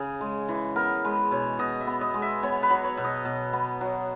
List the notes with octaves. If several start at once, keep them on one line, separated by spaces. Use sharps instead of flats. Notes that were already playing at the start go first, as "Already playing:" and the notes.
Already playing: C#3 G#4
G#3
E3
B3 A#4
G#3 B4
B2 C#5
B2 D#5
E5
B3
D#5
G#3
E5
B3 C#5
B4
F#3
C#5
B2
D#5
B2
B3
F#3